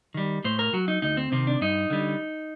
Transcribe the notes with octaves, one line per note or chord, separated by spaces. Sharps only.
D#3 G3
A2 C5
A#4
F#3 F#4
D#4
D2 D#4
C4
C3 D#3 C4
D4
G2 D#4
D3 G3